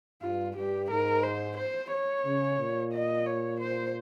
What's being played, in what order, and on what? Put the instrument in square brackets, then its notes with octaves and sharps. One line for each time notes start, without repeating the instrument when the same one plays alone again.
[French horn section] G2 [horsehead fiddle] F4
[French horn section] G2 [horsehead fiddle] G4
[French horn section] G#2 [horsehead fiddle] A#4
[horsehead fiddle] C5
C5
C#5
[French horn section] C#3
A#2
[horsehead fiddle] D#5
C#5
C5